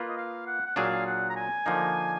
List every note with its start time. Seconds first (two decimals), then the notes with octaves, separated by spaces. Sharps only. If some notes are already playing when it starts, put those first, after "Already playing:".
Already playing: A#3 F4 B4
0.08 D#5
0.17 F5
0.47 F#5
0.66 F#5
0.76 A#2 F#3 D4 G#4 F5
1.07 F#5
1.30 A#5
1.36 G#5
1.66 D3 F3 A#3 D#4